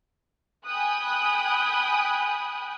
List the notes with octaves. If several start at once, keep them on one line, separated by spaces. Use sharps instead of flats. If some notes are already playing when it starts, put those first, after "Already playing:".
G5 G#5 B5 D#6 F#6